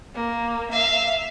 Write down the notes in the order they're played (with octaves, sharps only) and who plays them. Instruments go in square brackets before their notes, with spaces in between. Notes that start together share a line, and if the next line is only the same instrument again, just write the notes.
[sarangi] A#3
[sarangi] E5 [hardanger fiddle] F5